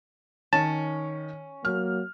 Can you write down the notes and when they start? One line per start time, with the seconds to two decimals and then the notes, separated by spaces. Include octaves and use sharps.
0.53 D#3 C#4 A5
1.65 F#3 A#3 F6